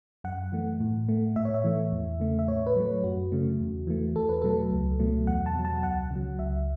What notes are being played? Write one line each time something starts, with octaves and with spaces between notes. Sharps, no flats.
F#2 F#5
E3 A3
A2
A3
A2 E5
C#5
E5
E3 A3
E2
C#3 A3
E5
A2 C#5
B4
F#3 A3
F#2 F#4
C#3 A3
E2
E3 A3
E2 A4
B4
B2 F#3 A3 A4
C#2
B2 F#3 A3
E2 F#5
A5
B2 F#3
A5
C#2 F#5
C#3 F#3
C#2 E5